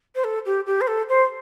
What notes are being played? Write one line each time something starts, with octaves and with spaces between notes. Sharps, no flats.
C5
A4
G4
G4
C5
A4
C5